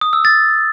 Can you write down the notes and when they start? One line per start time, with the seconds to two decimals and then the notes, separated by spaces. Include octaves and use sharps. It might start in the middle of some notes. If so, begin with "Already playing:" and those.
0.01 D#6
0.13 E6
0.25 A6